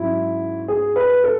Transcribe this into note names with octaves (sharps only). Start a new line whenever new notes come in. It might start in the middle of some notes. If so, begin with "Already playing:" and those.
Already playing: G#2 F#3 C#4 E4 F#4
G#4
B4
A4